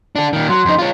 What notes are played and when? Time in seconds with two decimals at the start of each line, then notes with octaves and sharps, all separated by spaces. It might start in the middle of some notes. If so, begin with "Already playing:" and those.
0.16 D4 A4
0.33 A#2 D#3
0.49 F#3 C6
0.65 F2 D#4
0.79 F4 C#5